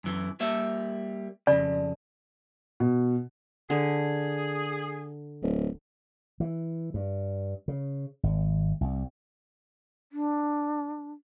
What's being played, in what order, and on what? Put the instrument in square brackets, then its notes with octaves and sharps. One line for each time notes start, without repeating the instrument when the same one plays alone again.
[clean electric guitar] F#2 E3
G3 A#3 E5
[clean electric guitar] F2 C#3 [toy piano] D5
[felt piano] B2
[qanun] D3 [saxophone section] G#4
[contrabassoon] D1
[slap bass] E3
G2
C#3
G#1
C2
[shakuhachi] D4